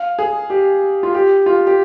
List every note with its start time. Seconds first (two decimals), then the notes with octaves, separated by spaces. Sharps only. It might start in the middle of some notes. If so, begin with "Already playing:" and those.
Already playing: F5
0.19 G#4
0.50 G4
1.03 F4
1.14 G4
1.46 F4
1.67 G4